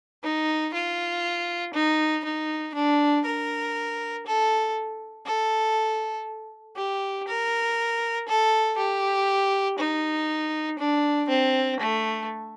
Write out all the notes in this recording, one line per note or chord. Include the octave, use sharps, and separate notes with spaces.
D#4
F4
D#4
D#4
D4
A#4
A4
A4
G4
A#4
A4
G4
D#4
D4
C4
A3